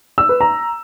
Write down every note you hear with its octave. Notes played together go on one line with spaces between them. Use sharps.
E6
B4
A#5